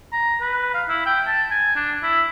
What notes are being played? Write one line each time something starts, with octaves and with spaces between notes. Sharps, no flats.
A#5
B4
F5
E4
G5
A5
G#5
D4
E4